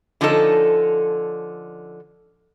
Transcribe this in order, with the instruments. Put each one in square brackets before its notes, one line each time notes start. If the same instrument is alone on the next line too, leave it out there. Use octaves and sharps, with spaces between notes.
[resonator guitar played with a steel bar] D3 F3 C#4 D#4 A4